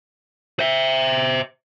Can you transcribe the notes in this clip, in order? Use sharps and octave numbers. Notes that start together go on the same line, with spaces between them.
C5 E5